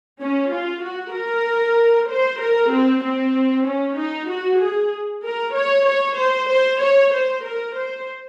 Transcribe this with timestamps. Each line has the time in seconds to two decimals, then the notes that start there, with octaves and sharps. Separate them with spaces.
0.22 C#4
0.53 F4
0.83 F#4
1.15 A#4
2.10 C5
2.41 A#4
2.72 C4
3.04 C4
3.67 C#4
3.99 D#4
4.30 F#4
4.62 G#4
5.25 A#4
5.56 C#5
5.87 C#5
6.19 C5
6.50 C5
6.81 C#5
7.13 C5
7.45 A#4
7.76 C5